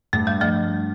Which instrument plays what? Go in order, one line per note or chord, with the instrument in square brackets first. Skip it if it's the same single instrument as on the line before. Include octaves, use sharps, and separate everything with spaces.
[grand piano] G2 [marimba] A3
[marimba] G3
F3 A3